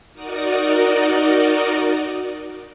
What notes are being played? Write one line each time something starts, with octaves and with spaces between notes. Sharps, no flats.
D#4 F#4 A#4 D5 D#5